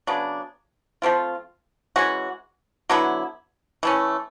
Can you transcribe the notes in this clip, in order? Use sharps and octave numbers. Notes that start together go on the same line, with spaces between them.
C#3 F#3 B3 D4
F3 A3 C4 F4
E3 G#3 C#4 F#4
D3 F#3 B3 E4
E3 A3 C#4